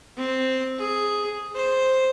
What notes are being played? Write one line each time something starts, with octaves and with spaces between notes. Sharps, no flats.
C4
G#4
C5